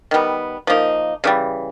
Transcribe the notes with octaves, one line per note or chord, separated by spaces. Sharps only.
D#3 G3 B3
F3 A#3 D#4
C#3 E3 G3